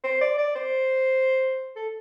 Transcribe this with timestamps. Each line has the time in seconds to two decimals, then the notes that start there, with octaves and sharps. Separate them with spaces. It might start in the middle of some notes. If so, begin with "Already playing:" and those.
0.04 C5
0.21 D5
0.38 D5
0.55 C5
1.76 A4